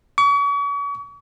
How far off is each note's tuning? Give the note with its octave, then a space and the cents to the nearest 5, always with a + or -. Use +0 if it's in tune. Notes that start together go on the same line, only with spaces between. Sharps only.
C#6 +40